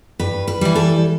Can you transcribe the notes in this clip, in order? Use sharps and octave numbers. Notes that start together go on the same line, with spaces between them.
G2 B4
B4
E3 G3
A4